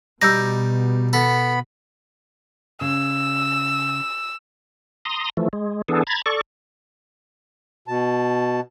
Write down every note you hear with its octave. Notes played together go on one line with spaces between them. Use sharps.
B2 G3 D#4 D6 E6 G6 A#6
B3 A4 B5
C#3 E6
A#5 C6 D#6
E3 F3 A3
G#3
E3 B3 D4 G#4 A4
A#5 B5 G#6 A6
A4 D5 C#6
B2 A5